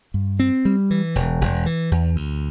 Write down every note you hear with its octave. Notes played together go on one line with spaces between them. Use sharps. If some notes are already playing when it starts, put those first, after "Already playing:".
G2
C4
G3
E3
E1
E1
E3
E2
D2